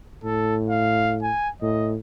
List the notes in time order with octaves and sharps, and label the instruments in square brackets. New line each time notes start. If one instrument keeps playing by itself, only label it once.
[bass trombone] A2 [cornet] A4
[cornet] F5
G#5
[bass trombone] A2 [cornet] D#5